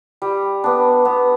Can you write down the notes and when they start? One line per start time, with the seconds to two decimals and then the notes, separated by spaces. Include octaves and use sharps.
0.22 G3
0.64 B3 D4
1.05 B3